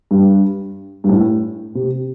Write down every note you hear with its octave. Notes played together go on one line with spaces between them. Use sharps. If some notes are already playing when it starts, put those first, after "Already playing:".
G2
G2
A2
C3